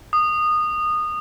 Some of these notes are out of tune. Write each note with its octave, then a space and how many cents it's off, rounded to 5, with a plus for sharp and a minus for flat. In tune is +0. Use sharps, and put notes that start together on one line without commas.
D#6 -20